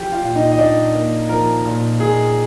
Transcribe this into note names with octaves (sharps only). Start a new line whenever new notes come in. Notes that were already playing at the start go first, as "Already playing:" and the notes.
Already playing: F3 G4 G5
F4 F5
A#2
D#4 D#5
D#5
A#2 D4 D5
A#3
F3 A#4
A#2
A#2 G#4